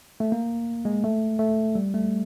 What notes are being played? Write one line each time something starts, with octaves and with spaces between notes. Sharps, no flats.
A3
A#3
G#3
A3
A3
G3
A3